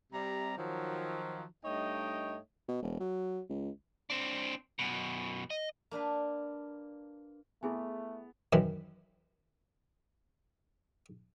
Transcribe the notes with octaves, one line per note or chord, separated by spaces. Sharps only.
C3 G3 A#5
D#3 F3 F#3
G2 A3 D#4 C#5 D#5 G5
B2
E1
F#3
C#2
C4 D4
F#2 B2
D#5
A#3 D4 F4 B4
A3 B3 E4 G#4 G#5
F#2 D#3 E3